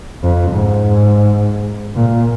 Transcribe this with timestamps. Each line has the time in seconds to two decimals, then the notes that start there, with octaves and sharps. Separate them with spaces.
0.23 F2
0.51 G#2
1.96 A#2